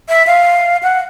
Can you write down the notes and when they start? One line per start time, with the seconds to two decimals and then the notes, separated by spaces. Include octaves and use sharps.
0.09 E5
0.27 F5
0.83 F#5